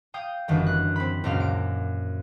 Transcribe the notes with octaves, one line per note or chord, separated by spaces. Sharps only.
F5 G5 D#6 G6
G1 F#2 D#3 E3
F#6
C4 B5
C#2 F#2 A#2 A#3 F6
D7